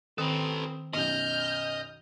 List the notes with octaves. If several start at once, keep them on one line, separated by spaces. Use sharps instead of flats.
D#3 C4 A4 B4 D#6
B1 F#2 B2 D#5 F6 G6